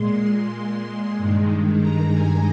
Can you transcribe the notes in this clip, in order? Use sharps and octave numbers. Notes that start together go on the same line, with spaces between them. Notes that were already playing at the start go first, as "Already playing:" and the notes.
Already playing: A#2 G#3 C6
G2 D#3 G#3
A#5
G#5